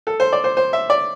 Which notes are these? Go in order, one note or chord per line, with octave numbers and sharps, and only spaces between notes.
A4
C5
D5
C5
C5
E5
D5